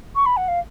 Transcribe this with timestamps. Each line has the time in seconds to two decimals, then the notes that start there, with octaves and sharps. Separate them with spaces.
0.15 C#6
0.25 B5
0.36 F#5
0.47 F5